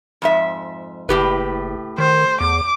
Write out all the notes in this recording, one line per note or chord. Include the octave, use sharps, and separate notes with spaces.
F2 G#2 E5
F#1 A2 G4 B4
D#3 C5
E2 D6